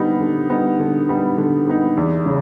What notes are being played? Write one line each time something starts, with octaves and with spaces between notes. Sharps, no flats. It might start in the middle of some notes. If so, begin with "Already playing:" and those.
Already playing: D3 G3 B3 D#4
D3
G3 B3 D#4
D3
G3 B3 D#4
D3
G3 B3 D#4
E2
C#3